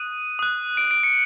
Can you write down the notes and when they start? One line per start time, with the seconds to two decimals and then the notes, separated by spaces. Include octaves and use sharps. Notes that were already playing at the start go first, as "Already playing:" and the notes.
Already playing: D#6 F#6 D#7
0.39 D#6 F#6
0.77 D7
0.91 D7
1.03 C#7